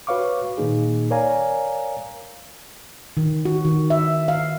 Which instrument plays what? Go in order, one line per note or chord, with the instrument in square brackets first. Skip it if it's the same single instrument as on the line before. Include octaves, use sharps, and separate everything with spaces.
[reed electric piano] F#4 B4 C#5 F5 C#6 D6
A#2 D#3 A#3 D#4 G#4
A#4 C#5 D5 F5 G#5 A#5
[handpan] D#3
F#4
D#3
E5
F5